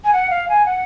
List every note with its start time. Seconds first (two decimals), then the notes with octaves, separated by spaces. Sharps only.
0.04 G#5
0.13 F#5
0.30 F5
0.49 G#5
0.66 F#5